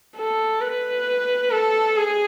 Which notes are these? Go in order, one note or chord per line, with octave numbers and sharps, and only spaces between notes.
A4
B4
A4
G#4